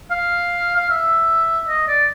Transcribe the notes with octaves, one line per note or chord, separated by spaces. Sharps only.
F5
F5
E5
D#5
D5